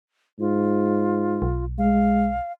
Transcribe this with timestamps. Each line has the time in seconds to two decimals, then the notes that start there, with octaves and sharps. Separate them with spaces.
0.39 G#2 F4
1.42 B1
1.79 G#3 F5